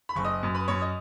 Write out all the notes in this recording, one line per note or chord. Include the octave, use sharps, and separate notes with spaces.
B5
F#1 C#6
D#5 D#6
F#2
B4 B5
F#2 C#5 C#6
D#5 D#6